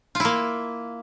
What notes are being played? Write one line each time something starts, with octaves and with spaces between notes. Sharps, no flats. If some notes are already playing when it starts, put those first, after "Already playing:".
A#3 E4 F4